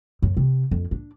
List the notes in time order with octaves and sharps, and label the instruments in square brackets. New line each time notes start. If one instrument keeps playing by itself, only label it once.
[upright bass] F#2
C3
F2
D4